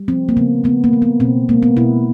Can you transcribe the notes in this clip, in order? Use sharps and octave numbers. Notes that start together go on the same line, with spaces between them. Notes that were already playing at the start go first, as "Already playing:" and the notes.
Already playing: G3
F3 C4
A#3
C#3 B3
A3 B3
A#3
A3
B3
B2 C4
G#3 A#3
B3
B2 E4